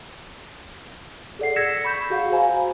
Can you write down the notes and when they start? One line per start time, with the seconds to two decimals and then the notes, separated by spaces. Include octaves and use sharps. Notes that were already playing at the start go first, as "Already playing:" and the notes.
1.39 G#4 A4 D5 F#5 C7
1.56 E6 G#6 A#6 B6 C#7 E7
1.84 B5 C#6 G6 E7
2.10 F#4 G#4 F5 F#5
2.32 C5 D#5 F5 G#5 A#5 B5
2.49 F#4